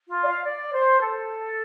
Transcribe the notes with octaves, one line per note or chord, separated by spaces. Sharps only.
F4
D5
F5
D5
C5
A4